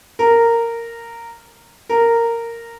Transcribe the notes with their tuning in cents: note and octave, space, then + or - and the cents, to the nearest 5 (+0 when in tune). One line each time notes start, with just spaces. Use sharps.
A#4 -10
A#4 -10